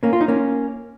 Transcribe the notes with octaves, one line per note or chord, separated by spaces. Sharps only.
A#3 C#4
F4
D#4
A#3 C#4